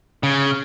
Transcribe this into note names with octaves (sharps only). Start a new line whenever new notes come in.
C#3